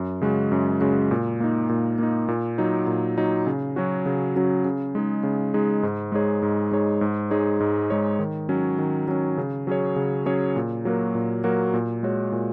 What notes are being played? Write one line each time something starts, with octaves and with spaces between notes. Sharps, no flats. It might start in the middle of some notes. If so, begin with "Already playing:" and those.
Already playing: F#2
C#3 G#3 F#4
F#2
C#3 G#3 F#4
A#2
A#3 D#4
A#2
A#3 D#4
A#2
F#3 D#4
A#2
F#3 D#4
C#3
F#3 C#4 F#4
C#3
F#3 C#4 F#4
C#3
G#3 D#4 G#4
C#3
G#3 D#4 G#4
G#2
G#3 D#4 G#4 C#5
G#2
G#3 D#4 G#4 C#5
G#2
G#3 D#4 G#4 C#5
G#2
G#3 D#4 G#4 C#5
D#3
F#3 C#4
D#3
F#3 C#4
C#3
F#3 C#4 G#4 C#5
C#3
F#3 C#4 G#4 C#5
A#2
F#3 A#3 F#4 A#4
A#2
F#3 A#3 F#4 A#4
A#2
G#3 F#4 C#5
A#2